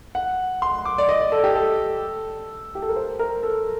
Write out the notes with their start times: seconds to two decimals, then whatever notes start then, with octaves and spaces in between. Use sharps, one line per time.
0.15 F#5
0.62 C6
0.85 D6
0.98 D5
1.09 D#5
1.21 D5
1.32 A4
1.44 G4
1.55 A4
2.75 G4
2.82 A4
2.89 A#4
2.96 C5
3.19 A#4
3.43 A4